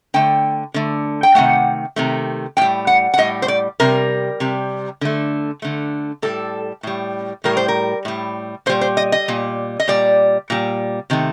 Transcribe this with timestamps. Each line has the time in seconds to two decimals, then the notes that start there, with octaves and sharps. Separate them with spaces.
0.14 D3 A3 G5
0.74 D3 A3
1.23 G5
1.35 C3 D#3 A3 F#5
1.96 C3 D#3 A3
2.57 A2 G3 G5
2.87 F#5
3.14 F#5
3.18 A2 G3 D#5
3.42 C5
3.48 D5
3.80 C3 G3 A#4
4.40 C3 G3
5.01 D3 A3
5.62 D3 A3
6.22 A2 G3 A4
6.83 A2 G3
7.44 A2 G3 A#4
7.57 C5
7.68 A#4
8.05 A2 G3
8.66 A#2 C5
8.69 G3
8.81 C5
8.97 D#5
9.12 D#5
9.28 A#2 G3
9.80 D#5
9.88 A#2 G3 D5
10.50 A#2 G3
11.10 C3 D#3 A3